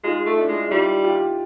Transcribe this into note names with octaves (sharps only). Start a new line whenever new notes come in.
G#3 D#4 F4
A3
D4 E4
G#3
E4
G3 D#4 F4
F4 G4